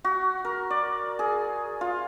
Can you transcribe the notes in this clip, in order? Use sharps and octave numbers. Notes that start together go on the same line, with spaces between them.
F#4
A#4
D5
G#4
F4